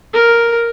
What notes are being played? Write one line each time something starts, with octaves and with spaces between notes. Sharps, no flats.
A#4